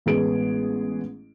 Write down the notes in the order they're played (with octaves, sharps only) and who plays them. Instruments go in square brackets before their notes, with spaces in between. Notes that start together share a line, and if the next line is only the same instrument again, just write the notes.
[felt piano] A1 G#3 B3 G#4 D7